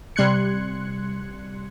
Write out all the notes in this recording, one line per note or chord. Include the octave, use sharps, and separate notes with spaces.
C3 G3 C6 F#6 G#6 C#7